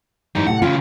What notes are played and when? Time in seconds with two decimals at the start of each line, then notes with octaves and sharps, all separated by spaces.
0.35 G#2 E3 G3 D#4
0.47 A2 C3 G4 F#5
0.62 E2 C#3 F4